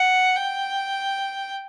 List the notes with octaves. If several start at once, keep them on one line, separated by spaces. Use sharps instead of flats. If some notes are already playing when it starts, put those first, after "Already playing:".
Already playing: F#5
G5